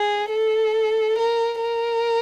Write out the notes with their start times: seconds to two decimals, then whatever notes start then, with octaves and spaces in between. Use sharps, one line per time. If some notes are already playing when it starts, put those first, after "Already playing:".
Already playing: G#4
0.31 A4
1.19 A#4
1.62 A#4